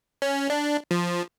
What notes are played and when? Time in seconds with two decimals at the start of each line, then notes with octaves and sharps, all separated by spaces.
0.22 C#4
0.50 D4
0.91 F3